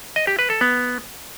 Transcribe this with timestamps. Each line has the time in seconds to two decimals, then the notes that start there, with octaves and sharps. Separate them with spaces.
0.16 D#5
0.27 G4
0.39 B4
0.50 A4
0.61 B3